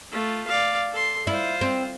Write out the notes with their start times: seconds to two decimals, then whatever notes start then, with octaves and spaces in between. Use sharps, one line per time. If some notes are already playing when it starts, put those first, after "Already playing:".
0.11 A3 F4
0.47 D5 F5
0.92 A4 C6
1.27 E4 F4 C5
1.61 C4